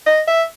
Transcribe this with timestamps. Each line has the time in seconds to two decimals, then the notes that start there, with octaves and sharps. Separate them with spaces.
0.06 D#5
0.28 E5